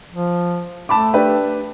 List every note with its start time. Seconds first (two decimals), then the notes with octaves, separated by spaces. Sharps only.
0.11 F3
0.89 A3 A5 B5 D6
1.14 D4 G4 B4